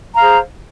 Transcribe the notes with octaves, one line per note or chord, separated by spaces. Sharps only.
G#4 C5 F5 A#5